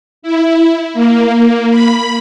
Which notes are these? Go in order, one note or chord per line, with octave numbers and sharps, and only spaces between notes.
E4
A#3
B5